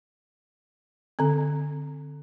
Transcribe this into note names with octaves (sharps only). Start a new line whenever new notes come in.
D3 C4